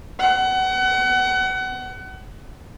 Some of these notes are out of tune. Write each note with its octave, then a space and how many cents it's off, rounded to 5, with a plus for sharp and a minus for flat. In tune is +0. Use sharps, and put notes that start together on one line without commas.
F#5 +30